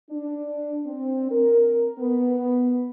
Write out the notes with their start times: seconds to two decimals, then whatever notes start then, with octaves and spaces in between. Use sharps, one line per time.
0.11 D4
0.86 C4
1.31 A#4
1.99 B3